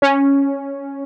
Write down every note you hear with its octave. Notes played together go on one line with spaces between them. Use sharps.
C#4